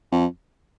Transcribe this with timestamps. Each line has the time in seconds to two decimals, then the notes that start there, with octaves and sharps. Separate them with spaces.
0.12 F2